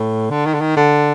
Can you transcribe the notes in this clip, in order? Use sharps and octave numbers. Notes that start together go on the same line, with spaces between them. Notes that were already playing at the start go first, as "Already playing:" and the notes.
Already playing: A2
D3
D#3
D3
D#3
D3